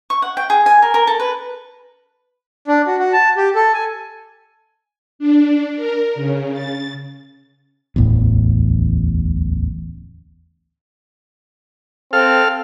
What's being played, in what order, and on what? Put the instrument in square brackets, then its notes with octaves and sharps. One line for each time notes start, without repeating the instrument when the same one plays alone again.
[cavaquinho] C#6
F#5
G5
G#4
G#5
A#4
A#4
A4
B4
[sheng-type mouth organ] D4
F#4
F#4
A5
G4
A4
G#5
[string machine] D4
A#4
C#3
A6
[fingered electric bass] D1 A1 E2
[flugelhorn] C4 [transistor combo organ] A4 F5 F6